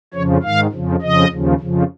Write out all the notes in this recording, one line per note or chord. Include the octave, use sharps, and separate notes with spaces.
F2 C#3 F3 C#5
G#2 D#3 F5
F2 C#3 F3
F2 C#3 F3 D#5
D#2 C#3 F3
F2 C#3 F3